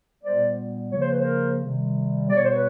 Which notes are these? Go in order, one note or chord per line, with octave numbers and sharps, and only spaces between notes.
A#2 G3 B3 C5 D5
C#3 F3 A#3 C#5
C5
B4
A#4 C5
C3 D#3 G3
B2 G3 B3 D5
C#5
C5
B4 C#5